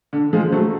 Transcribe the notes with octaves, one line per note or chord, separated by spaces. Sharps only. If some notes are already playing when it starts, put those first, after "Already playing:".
D3
F3 G#3
F#3 A3